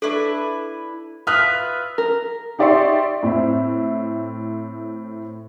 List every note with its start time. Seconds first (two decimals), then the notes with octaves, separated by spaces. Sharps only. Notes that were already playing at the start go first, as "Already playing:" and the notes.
0.02 D4 E4 A4 B4 C#6
1.27 F4 B4 E5 D#6 F6 F#6
1.98 A#4
2.59 D#4 G4 D5 E5 C6 C#6
3.23 A2 C4 E5